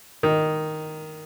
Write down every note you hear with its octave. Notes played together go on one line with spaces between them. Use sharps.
D#3